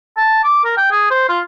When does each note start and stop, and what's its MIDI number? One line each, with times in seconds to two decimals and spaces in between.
0.17 0.44 81
0.44 0.62 86
0.64 0.75 70
0.77 0.87 79
0.91 1.06 68
1.10 1.25 72
1.29 1.39 65